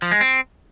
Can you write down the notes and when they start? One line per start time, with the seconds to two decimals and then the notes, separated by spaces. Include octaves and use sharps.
0.02 F3
0.12 G#3
0.21 C4